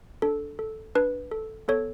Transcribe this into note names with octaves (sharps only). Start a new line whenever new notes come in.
D4 A4
A4
D4 B4
A4
B3 A4 C#5